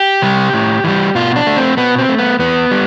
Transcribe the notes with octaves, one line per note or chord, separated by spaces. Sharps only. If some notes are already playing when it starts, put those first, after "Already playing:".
Already playing: G4
C3 G3
A2
E3 G3
B2 F4
D4
A3
C4
B2 B3
C4
A3
B3
E2 B3
G3